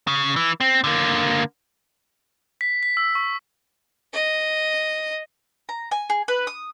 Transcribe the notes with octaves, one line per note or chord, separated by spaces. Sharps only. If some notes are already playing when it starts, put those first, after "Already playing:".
C#3
E3
C4
D3 A#3
B6
B6
E6
C#6
D#5
A#5
G#5
G#4
B4
D#6